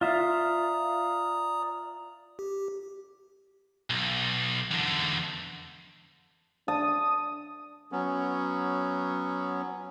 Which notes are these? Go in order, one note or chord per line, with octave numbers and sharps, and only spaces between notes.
F4 D5 E5 F5 A#5 D#6
G4
B1
E2 D3
D4 A5 D#6
F#3 B3 C#4